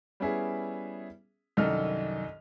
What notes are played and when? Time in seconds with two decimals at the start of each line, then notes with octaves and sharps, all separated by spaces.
0.20 G3 B3 C#4 E4 G#4 E5
1.57 C2 F#2 D#3 A4 D#5 F6